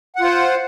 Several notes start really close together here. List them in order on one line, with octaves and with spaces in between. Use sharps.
F#5 F4 C5